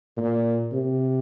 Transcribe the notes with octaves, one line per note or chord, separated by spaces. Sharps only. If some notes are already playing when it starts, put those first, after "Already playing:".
A#2
C3